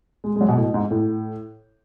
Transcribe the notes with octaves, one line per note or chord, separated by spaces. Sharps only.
G#3
G#3
F#3
B2
A2
G#2
A2